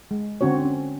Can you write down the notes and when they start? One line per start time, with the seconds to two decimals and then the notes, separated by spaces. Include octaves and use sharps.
0.11 G#3
0.41 D3 C4 C#4 F#4 C#5
0.65 C#4